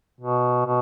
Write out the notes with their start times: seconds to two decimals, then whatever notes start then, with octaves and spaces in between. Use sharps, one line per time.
0.21 B2
0.66 B2